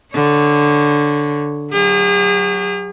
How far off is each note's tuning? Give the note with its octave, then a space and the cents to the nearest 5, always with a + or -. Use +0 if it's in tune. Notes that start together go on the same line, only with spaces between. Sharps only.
D3 +0 C#5 +0
F#3 +0 G#4 -45